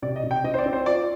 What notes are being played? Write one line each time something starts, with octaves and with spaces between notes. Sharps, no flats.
C3 D5
D#5
C3
G5
C4 D#5
C5
D5
C4
C5
F4 D5